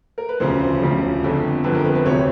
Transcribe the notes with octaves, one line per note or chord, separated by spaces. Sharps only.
A#4
B4
E1 D2 C#3 F3 C5
C5
E1 D2 C#3 F3
G1 F2 D3 F3
G1 F2 D3 F3 B4
A#4
B4
B4
E1 D2 C3 C#5